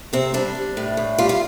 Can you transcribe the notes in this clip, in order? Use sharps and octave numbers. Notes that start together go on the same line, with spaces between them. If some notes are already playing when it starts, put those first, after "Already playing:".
C3 C4
G3 D4
G3
A2
A2
G3 F4
F4